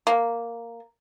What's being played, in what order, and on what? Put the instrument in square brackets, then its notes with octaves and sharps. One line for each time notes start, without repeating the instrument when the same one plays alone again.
[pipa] A#3